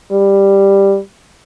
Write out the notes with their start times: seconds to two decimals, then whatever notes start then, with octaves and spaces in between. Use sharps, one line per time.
0.12 G3